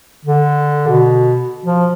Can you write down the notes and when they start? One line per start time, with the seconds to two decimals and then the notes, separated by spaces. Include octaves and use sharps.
0.25 D3
0.88 B2
1.65 F3